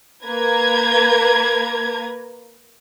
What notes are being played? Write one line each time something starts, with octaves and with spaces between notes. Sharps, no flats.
A#3 B4 A#5 G#6